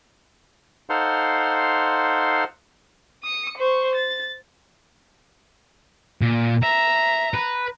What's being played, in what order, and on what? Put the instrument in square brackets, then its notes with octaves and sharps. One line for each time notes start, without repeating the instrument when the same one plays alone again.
[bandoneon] D#4 A4 C5 F5 F#5 C6
[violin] D#6 C#7
C5 C#6
A6
[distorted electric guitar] A#2
[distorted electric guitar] E5 [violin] A#5
[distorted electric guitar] B4